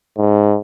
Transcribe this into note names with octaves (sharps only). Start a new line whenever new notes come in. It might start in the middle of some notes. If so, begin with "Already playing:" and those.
G#2